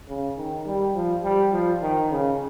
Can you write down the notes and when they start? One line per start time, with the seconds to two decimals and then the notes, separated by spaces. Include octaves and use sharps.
0.09 C#3
0.37 D#3
0.66 G3
0.95 F3
1.23 G3
1.53 F3
1.82 D#3
2.11 C#3